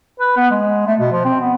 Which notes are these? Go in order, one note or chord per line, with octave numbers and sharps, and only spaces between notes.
B4
B3
G#3
A3
B2
F3
C4
B3